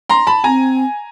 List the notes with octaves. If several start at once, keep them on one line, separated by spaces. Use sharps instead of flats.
A#5 C6
A5 B5
C4 G#5 A#5